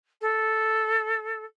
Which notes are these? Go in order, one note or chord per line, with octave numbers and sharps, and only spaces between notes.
A4